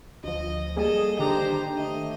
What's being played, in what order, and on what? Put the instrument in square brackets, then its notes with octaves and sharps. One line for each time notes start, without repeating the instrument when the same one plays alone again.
[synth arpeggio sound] D2 F3 [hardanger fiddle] D#5
[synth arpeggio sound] G3 A#3 [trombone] G#4 [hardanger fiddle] A4 D#5
[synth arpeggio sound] D3 D#3 D4 [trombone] G4 [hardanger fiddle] C5 A#5
[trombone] A3 [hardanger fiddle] D#5